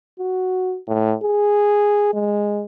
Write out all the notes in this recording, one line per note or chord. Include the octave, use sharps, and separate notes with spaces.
F#4
A2
G#4
G#3